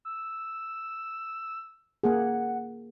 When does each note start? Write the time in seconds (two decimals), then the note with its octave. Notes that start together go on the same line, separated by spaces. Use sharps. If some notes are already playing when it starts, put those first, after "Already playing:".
0.05 E6
2.03 A#3 G#4 F#5